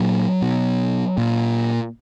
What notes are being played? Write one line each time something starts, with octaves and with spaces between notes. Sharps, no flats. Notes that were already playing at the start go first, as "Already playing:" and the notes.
Already playing: A#2 F#3
B2
A#2